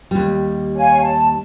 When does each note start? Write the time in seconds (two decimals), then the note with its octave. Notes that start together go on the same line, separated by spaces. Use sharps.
0.11 D#2 G3
0.77 C#5 F5 G#5
1.02 A5